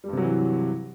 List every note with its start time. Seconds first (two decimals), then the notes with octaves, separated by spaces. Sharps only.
0.04 G3
0.08 G2
0.13 C3
0.17 F#3
0.22 E3